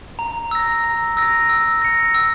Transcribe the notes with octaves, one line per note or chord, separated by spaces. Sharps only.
A#5
E6 A#6
A#5
E6 A#6
E6
A#6 C#7
E6